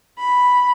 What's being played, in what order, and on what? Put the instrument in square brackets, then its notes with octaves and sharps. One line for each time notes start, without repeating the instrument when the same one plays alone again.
[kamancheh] B5